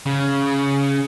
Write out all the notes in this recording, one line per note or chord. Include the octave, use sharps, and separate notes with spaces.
C#3